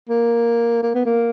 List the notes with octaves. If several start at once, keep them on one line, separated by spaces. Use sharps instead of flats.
A#3
A#3
B3
A#3